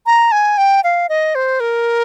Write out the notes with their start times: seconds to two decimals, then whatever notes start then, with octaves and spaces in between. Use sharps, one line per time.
0.06 A#5
0.32 G#5
0.57 G5
0.84 F5
1.09 D#5
1.35 C5
1.60 A#4